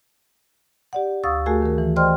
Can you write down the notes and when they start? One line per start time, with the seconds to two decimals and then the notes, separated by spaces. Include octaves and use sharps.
0.93 G4 D5 F#5
1.23 D2 F5 C#6 D#6 E6 A6
1.46 A3 F#4 G#4 A#4 G#5
1.62 D#3 A#4
1.78 E3
1.96 C5 D5 D#5 G5 C6 F6